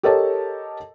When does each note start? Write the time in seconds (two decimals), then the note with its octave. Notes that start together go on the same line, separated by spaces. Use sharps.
0.03 G4 A4 A#4 C#5 D#5 A5